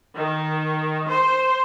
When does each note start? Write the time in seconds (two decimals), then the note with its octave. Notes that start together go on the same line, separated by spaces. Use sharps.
0.17 D#3
1.09 C5